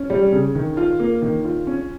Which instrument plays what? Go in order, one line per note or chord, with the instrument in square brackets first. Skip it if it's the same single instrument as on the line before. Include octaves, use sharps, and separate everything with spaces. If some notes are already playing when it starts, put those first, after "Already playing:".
Already playing: [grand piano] C#4
[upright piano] G3
C#3
D#3
F4
A#3
D#3
F4
C#4